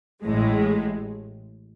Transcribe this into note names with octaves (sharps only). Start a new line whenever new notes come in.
A1 A2 G#3